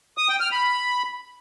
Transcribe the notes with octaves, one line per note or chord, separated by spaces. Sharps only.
D#6
G5
F6
B5